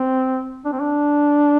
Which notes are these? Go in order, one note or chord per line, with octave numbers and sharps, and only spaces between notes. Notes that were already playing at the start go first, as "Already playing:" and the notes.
Already playing: C4
D4
C4
D4